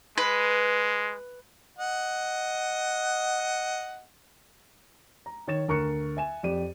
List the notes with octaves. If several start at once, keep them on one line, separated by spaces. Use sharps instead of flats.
G#3 B4
D#5 F#5
A#5
D#3 C#5 A6 E7
D2 A#4 C#6 F#6 C#7
E5 G#5 E7
F2 G4 D5 D#7